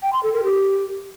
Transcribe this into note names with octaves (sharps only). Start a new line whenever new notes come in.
G5
C6
A4
A#4
G4